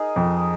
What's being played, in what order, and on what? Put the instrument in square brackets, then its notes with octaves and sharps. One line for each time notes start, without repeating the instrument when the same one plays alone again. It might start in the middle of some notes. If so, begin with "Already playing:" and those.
Already playing: [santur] D#4 G#4 A#4
[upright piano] F2